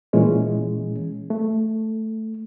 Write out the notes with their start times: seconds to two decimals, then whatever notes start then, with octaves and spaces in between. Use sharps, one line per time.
0.13 A#2 E3 G#3 C#4
1.30 A3